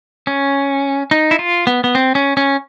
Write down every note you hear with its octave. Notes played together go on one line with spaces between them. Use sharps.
C#4
D#4
E4
F4
B3
B3
C4
C#4
C#4